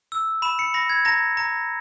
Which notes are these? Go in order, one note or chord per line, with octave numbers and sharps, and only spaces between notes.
E6
B5 E7
C#7
B5 A#6
G#6
A#5 A#6
A#5